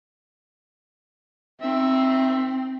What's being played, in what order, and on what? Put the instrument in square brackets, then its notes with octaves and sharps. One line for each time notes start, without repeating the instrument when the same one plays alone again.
[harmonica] D#3 E5 [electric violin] C4